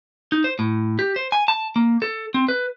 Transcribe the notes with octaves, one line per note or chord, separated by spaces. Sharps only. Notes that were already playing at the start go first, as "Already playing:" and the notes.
D#4
C5
A2
G4
C5
G#5
A5
A#3
A4
C4
B4